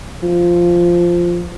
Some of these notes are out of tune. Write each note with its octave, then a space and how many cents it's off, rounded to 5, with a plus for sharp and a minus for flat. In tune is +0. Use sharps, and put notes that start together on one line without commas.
F3 -5